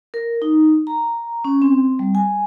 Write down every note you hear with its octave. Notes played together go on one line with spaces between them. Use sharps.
A#4
D#4
A#5
C#4
C4
G3
G#5